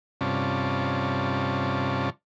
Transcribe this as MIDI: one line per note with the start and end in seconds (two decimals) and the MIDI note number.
0.21 2.10 43
0.21 2.10 48
0.21 2.10 61
0.21 2.10 65
0.21 2.10 74
0.21 2.10 81